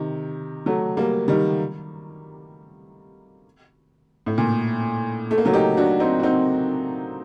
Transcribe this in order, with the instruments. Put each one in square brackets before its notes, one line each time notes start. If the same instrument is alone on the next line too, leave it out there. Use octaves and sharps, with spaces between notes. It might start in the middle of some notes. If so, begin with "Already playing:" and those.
Already playing: [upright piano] C3 D#3
F#3 A3
G3 A#3
D#3 G3
A2
A#2
A3
A#3
F#3 A3
D#4 G4
D4 F#4
C4 D#4
F#4
C4 D#4